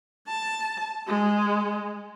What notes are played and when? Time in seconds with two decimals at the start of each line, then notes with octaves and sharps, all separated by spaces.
0.28 A5
1.07 G#3